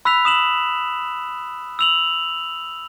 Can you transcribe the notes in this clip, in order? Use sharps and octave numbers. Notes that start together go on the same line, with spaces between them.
B5 E6 F#6 B6 F7
D#6 E7 F#7
E6 F7 F#7